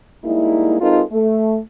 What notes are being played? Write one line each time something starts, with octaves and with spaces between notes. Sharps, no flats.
G3 G#3 A#3 D#4 E4
G#3 C4 D#4 F4 A4 A#4
A3